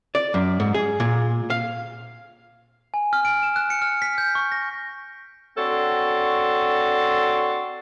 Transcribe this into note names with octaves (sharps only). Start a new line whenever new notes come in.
D5
F#2
G#2
G#4
A#2
F5
G#5
F6
D7
E7
F#6
C#7
F6
B6
G6
C#6
A#6
C4 D4 F#4 A4 C#5